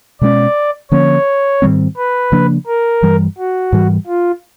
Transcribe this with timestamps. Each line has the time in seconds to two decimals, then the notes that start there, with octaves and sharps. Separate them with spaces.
0.21 B2 G#3 C#4 D5
0.91 D3 F3 A#3 C#4 C#5
1.62 G#2 D#3 G3 C4
1.97 B4
2.32 C#3 F3 A#3 D4
2.67 A#4
3.02 G2 E3 G3
3.38 F#4
3.72 G#2 E3 G3
4.07 F4